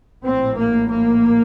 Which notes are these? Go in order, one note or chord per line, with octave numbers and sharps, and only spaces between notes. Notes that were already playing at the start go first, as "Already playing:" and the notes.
A#1 A2 C4
A#3
A#3